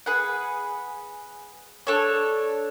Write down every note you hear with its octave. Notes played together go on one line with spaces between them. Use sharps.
G#4 B4 F#5
D4 A4 C#5